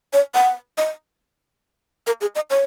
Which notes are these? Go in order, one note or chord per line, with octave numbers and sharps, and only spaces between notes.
C#5
F#5
D#5
A#4
G#4
D#5
C#5